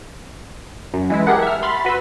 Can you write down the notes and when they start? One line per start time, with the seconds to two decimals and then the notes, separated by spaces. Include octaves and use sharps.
0.94 F#2
1.10 E3 G#3 E4
1.26 G4 G#4 A#4 F#5 A5
1.43 E5 F6
1.62 B5 C6 F6 A6 B6
1.85 F#4 B4 C6 E6